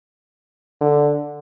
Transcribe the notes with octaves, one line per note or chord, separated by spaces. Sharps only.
D3